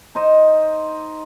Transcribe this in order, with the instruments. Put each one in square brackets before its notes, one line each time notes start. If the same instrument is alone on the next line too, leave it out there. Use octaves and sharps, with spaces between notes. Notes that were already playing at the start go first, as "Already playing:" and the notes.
[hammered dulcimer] D#4 C5 D#5